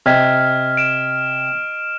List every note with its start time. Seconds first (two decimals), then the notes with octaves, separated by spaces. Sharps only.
0.06 C3 D#5 F6 G#6 B6
0.77 D7 E7